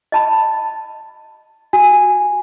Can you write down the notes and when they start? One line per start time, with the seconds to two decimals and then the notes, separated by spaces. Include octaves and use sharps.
0.12 D#5 A5 B5
1.73 F#4 G#5